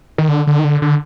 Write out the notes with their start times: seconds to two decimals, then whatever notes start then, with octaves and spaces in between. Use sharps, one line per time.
0.18 D#3
0.28 D3
0.47 D3
0.59 D#3
0.64 D3
0.82 D3